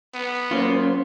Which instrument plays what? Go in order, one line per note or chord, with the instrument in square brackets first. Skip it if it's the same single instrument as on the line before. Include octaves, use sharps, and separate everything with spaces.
[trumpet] B3
[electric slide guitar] F#3 A#3 F4 [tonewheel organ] C#4 C5